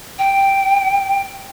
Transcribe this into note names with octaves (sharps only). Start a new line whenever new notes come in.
G5